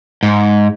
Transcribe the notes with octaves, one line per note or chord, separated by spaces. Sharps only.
G#2